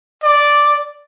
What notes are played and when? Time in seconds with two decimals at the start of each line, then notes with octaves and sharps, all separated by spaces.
0.24 D5